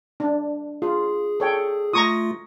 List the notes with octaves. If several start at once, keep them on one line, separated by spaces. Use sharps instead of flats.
D4
F4 G#4
A4 C#5 G5
A3 F4 A#5 C#6 D#6